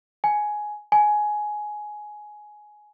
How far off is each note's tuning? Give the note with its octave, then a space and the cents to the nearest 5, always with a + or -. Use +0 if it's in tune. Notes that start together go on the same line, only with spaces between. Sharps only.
G#5 +10
G#5 +15